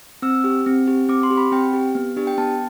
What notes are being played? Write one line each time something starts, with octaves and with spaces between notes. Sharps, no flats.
C4 E6
G4
C4
G4
C4 D6
C6
G4
B5
C4 G5
G4
B3
D4 G4
G5
B3 A5